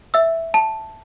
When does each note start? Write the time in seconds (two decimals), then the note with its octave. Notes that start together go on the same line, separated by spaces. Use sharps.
0.14 E5 E6
0.54 A5